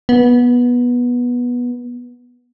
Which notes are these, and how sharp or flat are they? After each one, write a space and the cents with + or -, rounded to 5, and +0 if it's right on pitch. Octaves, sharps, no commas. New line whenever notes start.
B3 -15